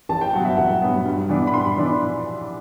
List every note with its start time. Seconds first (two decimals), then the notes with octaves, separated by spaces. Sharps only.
0.09 A1 A5
0.21 G5
0.33 G2 F#3 B3 F#5
0.45 E5
0.57 A1 F#5
0.82 G2 F#3 B3
1.05 G2
1.29 E3 B3 D4
1.47 B5
1.53 G2 C6
1.77 E3 B3 D4